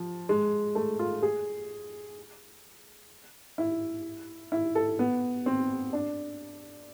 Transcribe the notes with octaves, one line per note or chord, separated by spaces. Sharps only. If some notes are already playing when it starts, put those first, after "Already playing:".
Already playing: F3
G#3
A3
F4
G#4
E4
E4
A4
B3
C4
D4